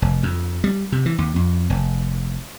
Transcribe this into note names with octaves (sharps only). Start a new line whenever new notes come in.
F1
F2
G3
C3
E3
D#2
F2
F1